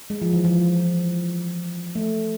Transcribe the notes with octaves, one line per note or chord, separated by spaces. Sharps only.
G#3
F3
E3
F3
A3